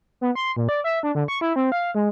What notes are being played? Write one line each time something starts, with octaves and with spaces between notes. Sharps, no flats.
B3
C6
A#2
D5
E5
D4
D3
C#6
E4
C4
F5
G#3